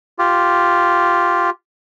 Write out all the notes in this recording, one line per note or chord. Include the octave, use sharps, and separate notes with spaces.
F4 G4